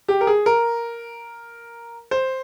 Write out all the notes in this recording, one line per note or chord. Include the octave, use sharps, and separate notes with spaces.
G4
A#4
G#4
A#4
C5